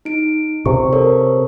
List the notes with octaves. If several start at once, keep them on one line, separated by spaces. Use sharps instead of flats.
D#4 D7
C3 C#6
A4 A#4 C#5